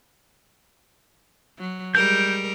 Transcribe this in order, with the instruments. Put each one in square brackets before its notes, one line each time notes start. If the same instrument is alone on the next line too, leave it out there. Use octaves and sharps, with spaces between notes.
[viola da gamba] F#3
[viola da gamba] G3 G#3 A#4 [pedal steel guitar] G6